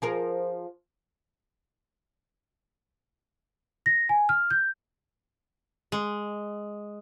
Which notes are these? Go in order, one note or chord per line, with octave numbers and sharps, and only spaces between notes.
F3 G#4 A#4
A#6
G#5
F6
G6
G#3